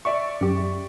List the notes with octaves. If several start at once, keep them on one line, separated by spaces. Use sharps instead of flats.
D5 E5 C#6
F#2 G4